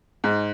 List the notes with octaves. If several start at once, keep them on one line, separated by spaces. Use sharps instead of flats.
G#2